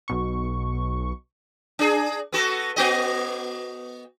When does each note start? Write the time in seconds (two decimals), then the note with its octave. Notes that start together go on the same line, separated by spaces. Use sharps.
0.08 B1 B2 C#6
1.79 D4 G#4
2.32 B3 F#4 A4
2.76 B3 F#4 D#5